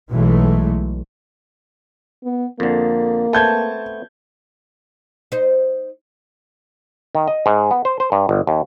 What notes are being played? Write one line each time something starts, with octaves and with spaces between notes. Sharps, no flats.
B1 E3 F#3 G#3 A3
B3
F2 D3 A#3
A3 B3 C4 A5 G6 G#6
D#4 C5
D#3
D#5
G#2
B3
C5
C5
G2
G1
D#2